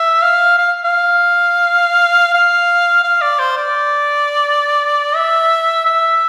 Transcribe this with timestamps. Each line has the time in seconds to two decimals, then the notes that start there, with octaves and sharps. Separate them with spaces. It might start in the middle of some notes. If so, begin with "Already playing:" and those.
Already playing: E5
0.23 F5
0.58 F5
0.85 F5
2.34 F5
3.04 F5
3.22 D5
3.39 C5
3.57 D5
5.16 E5
5.86 E5